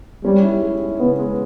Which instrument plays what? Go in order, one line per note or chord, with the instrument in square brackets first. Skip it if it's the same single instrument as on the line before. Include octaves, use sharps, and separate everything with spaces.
[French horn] G3 [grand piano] C#4
[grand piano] E4
G#3
E4
[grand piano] C#3 [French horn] B3
[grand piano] G#3